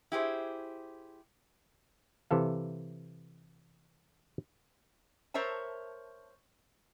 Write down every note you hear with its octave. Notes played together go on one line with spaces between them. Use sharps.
E4 G4 G#4 C5
C3 E3 A4 F5
A#4 C5 C#5 E5 A5